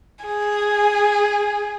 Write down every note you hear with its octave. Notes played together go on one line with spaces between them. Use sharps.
G#4